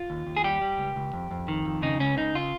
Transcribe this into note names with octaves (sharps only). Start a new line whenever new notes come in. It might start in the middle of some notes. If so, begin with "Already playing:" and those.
Already playing: F4
D#2
D#2
G#4
G3 G4
G3
C#2
C#2
F2
F2
D#3
F2
C#3 D#4
C#2 C#4
C#3 D#4
F4